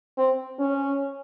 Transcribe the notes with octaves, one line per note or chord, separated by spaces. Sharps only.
C4
C#4